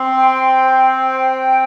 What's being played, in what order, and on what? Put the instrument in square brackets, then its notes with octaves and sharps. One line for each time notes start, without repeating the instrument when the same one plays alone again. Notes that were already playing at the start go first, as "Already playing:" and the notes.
Already playing: [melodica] C4 [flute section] C6
[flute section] G5
C5
G5